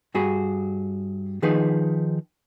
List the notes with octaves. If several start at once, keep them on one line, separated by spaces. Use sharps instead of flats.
G2 F#4 G#4 B5
D#3 F3 D#4 G#4 B4